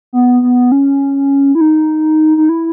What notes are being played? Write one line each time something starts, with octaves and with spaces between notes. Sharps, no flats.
B3
B3
C#4
E4
D#4
D#4
E4